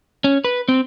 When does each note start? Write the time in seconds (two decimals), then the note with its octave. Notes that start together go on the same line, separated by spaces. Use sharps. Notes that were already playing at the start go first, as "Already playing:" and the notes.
0.24 C#4
0.45 B4
0.69 C4